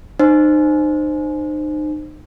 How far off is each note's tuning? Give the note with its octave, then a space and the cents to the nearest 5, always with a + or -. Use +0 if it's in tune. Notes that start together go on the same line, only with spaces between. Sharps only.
D#4 -35 C5 +0